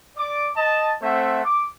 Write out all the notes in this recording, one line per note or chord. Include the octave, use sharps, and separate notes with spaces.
D5 D6
D#5 A5
A3 C4 C5 E5 F#5
D6